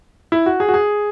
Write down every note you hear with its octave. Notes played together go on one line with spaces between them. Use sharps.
E4
F#4
G#4
F#4
G#4